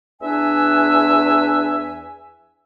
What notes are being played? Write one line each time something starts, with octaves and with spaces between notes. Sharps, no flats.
E2 D4 E5 G#5